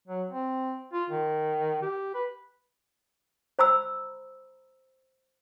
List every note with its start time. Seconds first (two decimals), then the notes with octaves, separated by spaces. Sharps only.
0.08 F#3
0.31 C4
0.93 F4
1.10 D#3
1.82 G4
2.14 B4
3.59 C5 A#5 B5 E6